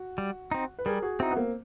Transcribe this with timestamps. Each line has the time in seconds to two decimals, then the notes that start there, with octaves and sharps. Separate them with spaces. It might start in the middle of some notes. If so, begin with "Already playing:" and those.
Already playing: F#4
0.18 G3
0.51 C4 D#4
0.79 B4
0.86 G3 G#4 A#4
1.02 F#4 G#4
1.19 C4 D#4 E4 F#4
1.31 B3
1.37 A#3 C4